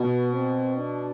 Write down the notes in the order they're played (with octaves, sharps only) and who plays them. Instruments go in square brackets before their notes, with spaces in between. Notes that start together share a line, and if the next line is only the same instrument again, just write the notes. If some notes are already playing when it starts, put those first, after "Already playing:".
Already playing: [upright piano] B2 [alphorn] B3
[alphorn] C4
D4